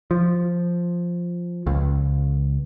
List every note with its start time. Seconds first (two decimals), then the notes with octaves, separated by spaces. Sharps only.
0.11 F3
1.67 C#2